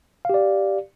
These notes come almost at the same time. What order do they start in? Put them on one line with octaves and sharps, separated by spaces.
F5 G4 D5